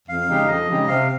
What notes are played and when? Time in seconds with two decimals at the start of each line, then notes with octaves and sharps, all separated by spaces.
0.08 F2 F5
0.29 C#3 G#3 D#4 G4
0.48 F2 D#5
0.68 C#3 G#3 D#4 G4
0.87 C3 F5